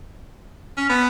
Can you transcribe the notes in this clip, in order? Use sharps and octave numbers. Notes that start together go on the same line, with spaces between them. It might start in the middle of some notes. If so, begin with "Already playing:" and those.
C#4
B3